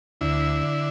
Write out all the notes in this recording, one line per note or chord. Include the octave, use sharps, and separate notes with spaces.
D2 E4
D3